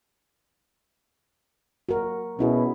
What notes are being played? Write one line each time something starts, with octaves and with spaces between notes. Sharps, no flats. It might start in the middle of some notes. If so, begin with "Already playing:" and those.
F#4 A#4
B2 C#4 E4 G#4